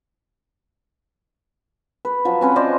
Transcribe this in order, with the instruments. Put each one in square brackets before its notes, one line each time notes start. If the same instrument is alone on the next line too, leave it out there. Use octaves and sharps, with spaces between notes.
[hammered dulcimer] B4
F3 F#3
C4 C#4 B4
C5 D5 D#5